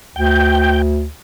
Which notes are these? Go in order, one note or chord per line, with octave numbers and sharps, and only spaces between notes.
D2 G5